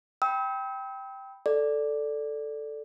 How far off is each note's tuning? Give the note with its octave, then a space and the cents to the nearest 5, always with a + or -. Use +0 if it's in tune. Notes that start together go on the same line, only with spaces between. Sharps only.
G5 +0 B5 +0 E6 -40
A4 +0 D5 +0